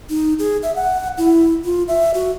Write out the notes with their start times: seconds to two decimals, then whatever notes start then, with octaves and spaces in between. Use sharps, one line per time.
0.10 D#4
0.39 G#4
0.63 E5
0.75 F#5
1.18 E4
1.64 F4
1.88 E5
2.14 F#4